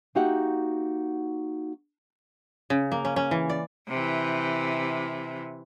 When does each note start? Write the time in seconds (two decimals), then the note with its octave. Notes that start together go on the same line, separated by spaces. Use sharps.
0.15 A#3 D#4 F#4 G4 E5 F#5
2.70 C#3
2.92 A#3
3.05 C#4
3.16 C#4
3.31 E3
3.50 D5
3.88 C3 E3